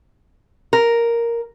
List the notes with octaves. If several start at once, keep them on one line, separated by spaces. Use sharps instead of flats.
A#4